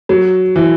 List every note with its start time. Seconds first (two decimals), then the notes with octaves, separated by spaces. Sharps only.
0.09 F#3
0.56 E3